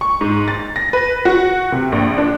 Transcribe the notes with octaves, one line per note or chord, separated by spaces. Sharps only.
C#6
G#2
A6
A#6
B4
F#4
C3
A#1
D4